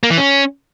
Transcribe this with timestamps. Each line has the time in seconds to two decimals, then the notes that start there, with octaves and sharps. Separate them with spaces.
0.03 A#3
0.11 E3
0.18 C#4